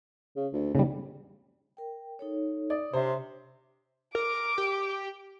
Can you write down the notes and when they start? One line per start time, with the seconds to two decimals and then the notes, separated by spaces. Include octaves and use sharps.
0.37 C#3
0.53 D2
0.75 D#2 C#3 G3
1.77 A#4 G5
2.19 D#4 A4 C#5
2.70 D5 D#6
2.93 C3 D4 C5 C#5 E5
4.15 A#4 D6
4.58 G4